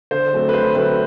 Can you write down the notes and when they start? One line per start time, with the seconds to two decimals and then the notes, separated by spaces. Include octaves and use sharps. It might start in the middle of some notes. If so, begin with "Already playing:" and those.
0.11 D3 C5
0.33 F#3 A3 C4
0.49 B4
0.53 D3 C5
0.75 F#3 A3 C4 B4